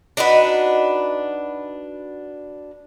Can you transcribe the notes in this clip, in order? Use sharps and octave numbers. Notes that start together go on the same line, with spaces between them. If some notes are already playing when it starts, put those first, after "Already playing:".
D4 D#4 F#4 B4